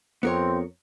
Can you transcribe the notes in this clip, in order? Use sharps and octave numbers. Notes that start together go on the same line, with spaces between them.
F2 B3 C4 A#4 C#5